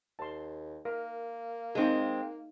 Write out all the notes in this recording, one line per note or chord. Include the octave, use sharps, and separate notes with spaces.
D#2 A5 C6
A#3 A#4
G#3 C4 D#4 G#4